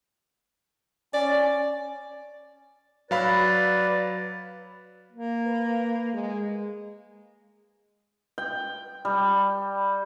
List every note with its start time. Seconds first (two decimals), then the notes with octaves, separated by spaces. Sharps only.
1.14 C#4 D5
3.11 F#3 B4 D5 F5 B5
5.12 A#3
5.46 B4
6.14 G#3
8.38 G5
9.05 G3